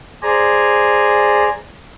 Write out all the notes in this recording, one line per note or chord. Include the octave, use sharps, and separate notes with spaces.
G#4 C5 D5 G#5 A#5